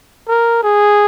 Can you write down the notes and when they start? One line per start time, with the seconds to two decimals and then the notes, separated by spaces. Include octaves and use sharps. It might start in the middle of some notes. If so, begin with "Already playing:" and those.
0.28 A#4
0.63 G#4